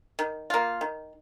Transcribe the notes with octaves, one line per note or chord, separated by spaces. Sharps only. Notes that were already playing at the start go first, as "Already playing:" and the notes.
D#3
A#3 F4
D#3